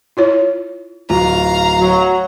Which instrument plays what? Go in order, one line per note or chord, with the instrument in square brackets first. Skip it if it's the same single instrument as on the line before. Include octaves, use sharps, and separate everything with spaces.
[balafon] E4 F4 C#5
[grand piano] D1 [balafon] F4 [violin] F5 A#5
[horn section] F#3